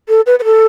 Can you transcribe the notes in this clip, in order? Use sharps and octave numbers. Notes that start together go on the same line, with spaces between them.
A4
B4
B4
A4